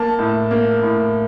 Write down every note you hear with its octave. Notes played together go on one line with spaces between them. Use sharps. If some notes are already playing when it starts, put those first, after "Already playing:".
Already playing: A#3 A5
A2
A#3
A2